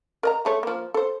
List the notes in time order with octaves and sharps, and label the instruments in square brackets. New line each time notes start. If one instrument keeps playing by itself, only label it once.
[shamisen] A#4 D#5 A#5
G#3 A3 C#5
F3 A#3
A4 C5